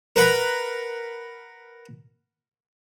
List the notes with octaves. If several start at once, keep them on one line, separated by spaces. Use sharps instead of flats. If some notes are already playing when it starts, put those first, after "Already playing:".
A#4 B4 F#5 B5